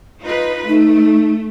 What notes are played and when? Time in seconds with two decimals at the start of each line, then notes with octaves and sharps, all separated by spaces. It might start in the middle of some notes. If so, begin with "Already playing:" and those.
0.22 D#4 F4 B4
0.69 A3 D#4